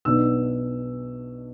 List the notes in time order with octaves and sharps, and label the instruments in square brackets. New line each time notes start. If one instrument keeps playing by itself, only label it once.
[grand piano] B1 B2 B3 D4 E6